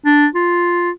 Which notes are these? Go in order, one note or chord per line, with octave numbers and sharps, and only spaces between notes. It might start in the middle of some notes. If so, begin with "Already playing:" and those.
D4
F4